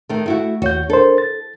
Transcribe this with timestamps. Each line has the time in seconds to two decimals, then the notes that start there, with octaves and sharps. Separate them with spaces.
0.09 D#3 A3
0.26 A3 E4 F#4
0.62 D#2 F#4 C#5 G6
0.90 D4 A4 A#4 C5
1.18 A6